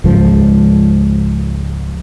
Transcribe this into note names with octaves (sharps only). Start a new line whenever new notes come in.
C#2 G#2 F3